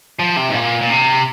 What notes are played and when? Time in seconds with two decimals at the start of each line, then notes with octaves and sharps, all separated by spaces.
0.19 F3
0.36 C3
0.49 G#2
0.54 A#2
0.81 A#2
0.89 C3